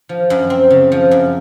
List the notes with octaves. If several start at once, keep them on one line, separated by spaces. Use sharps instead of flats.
F3
F#2
C4
C#3
F3
F#2